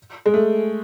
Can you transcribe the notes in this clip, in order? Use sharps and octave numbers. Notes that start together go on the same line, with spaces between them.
G#3
A3